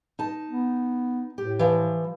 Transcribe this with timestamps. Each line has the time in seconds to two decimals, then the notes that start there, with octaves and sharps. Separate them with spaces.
0.19 D#4 A5
0.50 B3
1.38 A2 G4
1.59 E3 F3